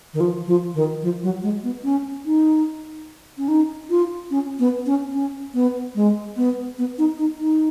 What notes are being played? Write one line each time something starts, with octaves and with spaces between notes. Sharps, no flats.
D#3
F3
F3
D#3
F3
F#3
G#3
B3
C#4
D#4
C#4
D#4
F4
C#4
B3
C#4
C#4
B3
G#3
B3
B3
D#4
D#4
D#4